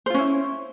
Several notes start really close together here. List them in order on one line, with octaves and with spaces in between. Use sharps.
C5 F4 C#4 E4